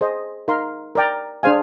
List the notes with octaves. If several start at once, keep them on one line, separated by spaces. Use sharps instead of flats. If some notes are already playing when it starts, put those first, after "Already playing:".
G#4 C5 D#5
D#4 A#4 F5 C6
A#4 D5 G5 A#5
D4 G#4 C5 F5 G#5